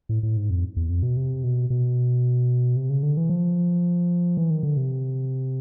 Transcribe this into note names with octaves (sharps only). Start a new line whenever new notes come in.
A2
A2
G#2
F2
E2
F2
B2
C3
B2
B2
C3
C#3
D3
E3
F3
E3
D#3
D3
C3